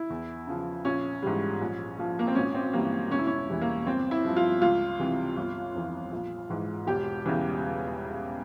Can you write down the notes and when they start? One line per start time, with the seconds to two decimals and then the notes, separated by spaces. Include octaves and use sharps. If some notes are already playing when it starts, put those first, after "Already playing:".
Already playing: E4
0.10 E2
0.47 C#3 F3
0.85 A#1 C#4
1.22 G#2 E3 G3
1.61 A#1
1.98 A#2 F3
2.19 A#3
2.27 C4
2.35 G#1 C#4
2.54 C4
2.73 G2 E3 G3 A#3
3.10 E1 C#4
3.19 E4
3.27 C#4
3.49 E2 E3 G3
3.61 A#3
3.86 G1 C4
4.11 E4
4.24 G2 F3
4.36 F4
4.61 C#2 F4
4.99 C3 E3 G3
5.37 G1
5.75 F2 E3
6.12 A#1
6.50 G#2 E3
6.87 E1 G4
7.25 E2 C#3 E3 G3